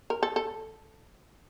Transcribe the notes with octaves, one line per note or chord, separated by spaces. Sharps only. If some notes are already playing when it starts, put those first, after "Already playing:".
A#4
A4
A4